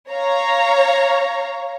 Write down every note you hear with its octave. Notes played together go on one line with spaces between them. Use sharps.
C#5 F5 A#5